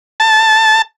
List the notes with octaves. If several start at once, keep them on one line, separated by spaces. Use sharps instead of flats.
A5